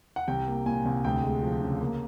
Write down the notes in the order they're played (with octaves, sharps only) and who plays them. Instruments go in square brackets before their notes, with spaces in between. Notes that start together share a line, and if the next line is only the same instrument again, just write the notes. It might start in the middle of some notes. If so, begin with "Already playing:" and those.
[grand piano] F#5
C2 G5
A#3
A#2 G#5
C2
D2 G5
G#3
F3
C#3
A#3